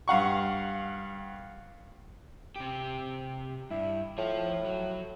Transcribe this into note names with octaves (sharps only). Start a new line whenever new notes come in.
G2 F5 F#5 C#6
C3 G4
G2 E4
A2 F3 F4
F#3